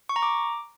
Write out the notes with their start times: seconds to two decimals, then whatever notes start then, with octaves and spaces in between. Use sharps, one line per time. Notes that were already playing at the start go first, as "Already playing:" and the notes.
0.09 C#6
0.16 A#5
0.22 D6